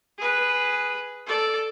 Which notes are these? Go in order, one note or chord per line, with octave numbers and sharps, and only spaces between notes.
G#4 B4
A4 D5